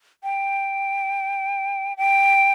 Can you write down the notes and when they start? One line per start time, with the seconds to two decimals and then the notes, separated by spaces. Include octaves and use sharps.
0.24 G5
1.97 G5